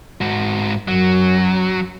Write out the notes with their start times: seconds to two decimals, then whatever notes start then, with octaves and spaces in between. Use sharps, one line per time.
0.21 G#2 F#4
0.88 F#2 F#3